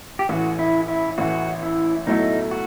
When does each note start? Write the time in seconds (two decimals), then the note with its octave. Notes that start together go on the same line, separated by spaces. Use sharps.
0.19 G4
0.29 A1 A2 E3 F#4
0.59 E4
0.88 E4
1.18 A1 A2 E3 F#4
1.63 E4
2.07 B1 A2 F#3 A3 D#4 E4
2.51 F#4